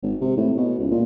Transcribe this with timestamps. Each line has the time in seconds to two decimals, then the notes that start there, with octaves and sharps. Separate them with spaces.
0.02 G#1
0.21 C3
0.37 A2
0.57 B2
0.79 C#2
0.91 A#2